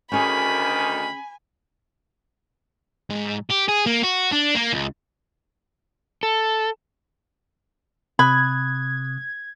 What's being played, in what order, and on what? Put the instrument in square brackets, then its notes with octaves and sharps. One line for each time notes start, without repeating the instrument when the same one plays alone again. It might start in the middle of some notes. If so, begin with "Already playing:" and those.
[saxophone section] D2 D#3 [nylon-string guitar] C#4 G#4 [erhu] G#5 [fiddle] B5
[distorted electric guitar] G#2
G4
G#4
A#3
F#4
D4
A#3
C#2
[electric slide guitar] A4
[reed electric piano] C3 D#6 F#6 [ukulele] B5 [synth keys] G#6